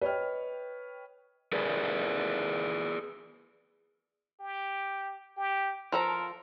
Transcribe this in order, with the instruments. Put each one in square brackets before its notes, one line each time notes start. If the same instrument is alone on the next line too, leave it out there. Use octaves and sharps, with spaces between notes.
[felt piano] B4 C#5 D#5 G5 F6
[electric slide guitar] G#4 A#4 B4 D5
[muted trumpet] G4
G4
[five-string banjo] F3 A4 A#5 [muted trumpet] A#4